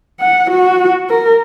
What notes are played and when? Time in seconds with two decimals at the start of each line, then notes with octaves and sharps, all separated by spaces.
0.20 F#5
0.51 F#4
1.10 A#4